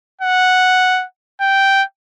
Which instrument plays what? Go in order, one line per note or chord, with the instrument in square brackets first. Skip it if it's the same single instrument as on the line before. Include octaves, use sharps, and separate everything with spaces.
[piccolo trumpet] F#5
G5